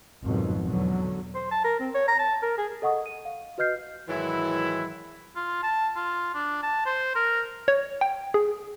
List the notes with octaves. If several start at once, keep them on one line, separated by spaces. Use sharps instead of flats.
G#1 F2 B2 F#3
E2 B2 D3 F#3
C5
A5
A#4
C4
C#5
A#5
A5
A#4
G#4
A4 D#5 F#5 C#6 D#6
D#7
F5
F#4 B4 D#5 F6 G6 C7
G#2 D#3 E3 F#3 E4
F4
A5
F4
D4
A5
C5
A#4
C#5
G5
G#4